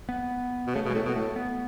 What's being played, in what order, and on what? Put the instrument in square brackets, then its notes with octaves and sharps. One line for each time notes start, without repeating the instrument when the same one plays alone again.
[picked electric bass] B3
[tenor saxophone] B2
[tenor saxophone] C#3 [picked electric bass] A3
[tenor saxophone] B2
[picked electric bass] G#3
[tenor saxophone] A2 [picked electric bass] A3
[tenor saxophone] B2
[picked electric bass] B3
[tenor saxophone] A2 [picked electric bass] A3
[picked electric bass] B3